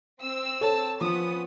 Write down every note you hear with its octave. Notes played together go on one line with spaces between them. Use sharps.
C4 E6
A4 C#5 A5
F3 B3 C#4 D#6